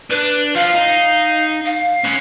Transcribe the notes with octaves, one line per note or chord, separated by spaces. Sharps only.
D4 B4
F3 F5
D#4
F5
C#4 B4